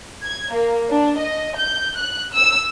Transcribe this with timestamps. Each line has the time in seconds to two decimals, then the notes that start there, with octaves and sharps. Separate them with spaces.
0.24 G#6
0.54 A#3
0.92 D4
1.20 D#5
1.57 G6
1.98 F#6
2.34 E6